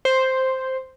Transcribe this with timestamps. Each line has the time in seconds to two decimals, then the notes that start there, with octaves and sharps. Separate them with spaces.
0.05 C5